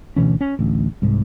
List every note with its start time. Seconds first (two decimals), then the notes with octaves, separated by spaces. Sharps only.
0.16 D2 B2 E3 C#4
0.41 C#4
0.59 A1 D2
1.02 C2 G#2